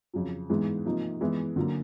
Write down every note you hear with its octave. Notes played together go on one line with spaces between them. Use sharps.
F2 C#3 F#3
G#2 E3 G#3 B3
C3 F3 A#3 D#4
E3 G#3 B3 E4
D3 F#3 A#3